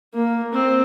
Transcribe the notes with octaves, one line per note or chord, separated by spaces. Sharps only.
A#3
C4